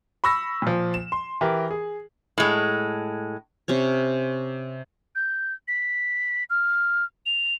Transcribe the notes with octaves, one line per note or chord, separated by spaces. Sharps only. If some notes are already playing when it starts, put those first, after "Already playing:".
B5 C#6 E6 A#6
A#2 F3
E7
C6
E3 G4 A#4
G#4
A2 G#3
C3 C#4 C#5
G6
B6
F6
F7